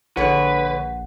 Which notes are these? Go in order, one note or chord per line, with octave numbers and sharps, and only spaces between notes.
A#1 D3 G#4 B4 C#5 F#5